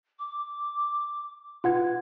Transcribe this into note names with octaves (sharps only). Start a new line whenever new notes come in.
D6
F4 B4 F#5 G#6